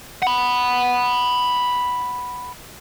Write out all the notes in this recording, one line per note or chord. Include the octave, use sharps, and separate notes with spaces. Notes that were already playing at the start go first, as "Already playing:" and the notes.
F#5 B5